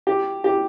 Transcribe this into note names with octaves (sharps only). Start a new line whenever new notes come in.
G4
G4